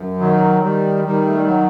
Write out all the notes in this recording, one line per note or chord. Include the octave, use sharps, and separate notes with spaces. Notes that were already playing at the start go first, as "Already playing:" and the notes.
Already playing: F#2
D#3 F#3
D#3 G3
D#3 G3
A3
G3
F#3